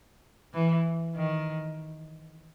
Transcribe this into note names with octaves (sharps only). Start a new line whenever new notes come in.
E3
D#3